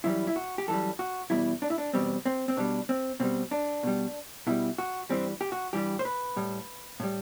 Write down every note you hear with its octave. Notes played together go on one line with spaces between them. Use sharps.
F#2 E3 G3 E4
E4
F#4
G4
F#2 E3 G3 A4
F#4
E2 B2 G3 E4
D4
E4
D4
E2 B2 G3 C4
C4
C4
B2 G3 D4
C4
B2 G3 C4
D4
B2 G3
B2 G3 E4
F#4
G2 E3 G3 C4
G4
F#4
G2 E3 G3 G4
C5
B4
A2 G3
A2 G3